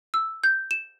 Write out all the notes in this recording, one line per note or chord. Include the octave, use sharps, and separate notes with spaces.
E6
G6
E7